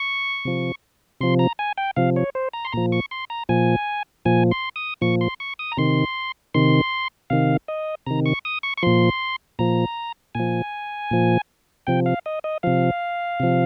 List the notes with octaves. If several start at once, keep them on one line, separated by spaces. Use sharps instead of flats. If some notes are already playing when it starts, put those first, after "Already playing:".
Already playing: C#6
C3 F3
C3 F3 C6
A#5
G#5
G5
C3 F3 F5
C#5
C5
A#5
C6
A#2 F3 A#5
C#6
C6
A#5
A#2 F3 G#5
A#2 F3 G#5
C6
D#6
A#2 F3 C#6
C6
C#6
D#6
A#5
C3 D#3 C6
C3 D#3 C6
C3 D#3 F5
D#5
C3 D#3 A#5
C#6
D#6
C#6
C#6
A#2 F3 C6
A#2 F3 A#5
A#2 F3 G#5
A#2 F3
C3 F3 G5
F5
D#5
D#5
C3 F3 F5
C3 F3